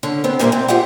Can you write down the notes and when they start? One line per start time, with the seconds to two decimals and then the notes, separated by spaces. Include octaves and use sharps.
0.03 D3 C#4
0.24 B3 C4
0.39 A#2 G3 A#3 B4 C5 E5
0.52 C4
0.68 F4 G4 G#4 E5 F#5